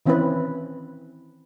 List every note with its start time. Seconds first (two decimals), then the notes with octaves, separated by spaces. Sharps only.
0.06 D#3 E3 C4 C#4 E4 B4